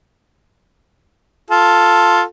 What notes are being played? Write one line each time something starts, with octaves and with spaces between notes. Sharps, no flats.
F4 A4